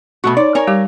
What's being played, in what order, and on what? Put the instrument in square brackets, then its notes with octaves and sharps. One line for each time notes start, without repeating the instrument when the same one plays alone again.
[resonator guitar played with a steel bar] B2 A3 F#4 [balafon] B5 C#6
[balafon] D#4 C#5 [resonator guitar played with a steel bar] D5
[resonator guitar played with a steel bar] A#4 C#5 [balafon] G#5
[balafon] G3 G4 D6